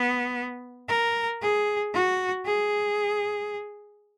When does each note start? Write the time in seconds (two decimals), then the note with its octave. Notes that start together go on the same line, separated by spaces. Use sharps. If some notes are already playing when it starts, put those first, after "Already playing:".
Already playing: B3
0.89 A#4
1.42 G#4
1.93 F#4
2.46 G#4